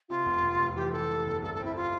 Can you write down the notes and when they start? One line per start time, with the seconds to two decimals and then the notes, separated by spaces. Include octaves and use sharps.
0.09 C3 F4
0.26 F1
0.42 F1
0.59 F1
0.76 E3 G4
0.92 E3 A4
1.09 E3
1.26 G1
1.42 C2 A4
1.54 A4
1.60 C4 E4
1.76 F4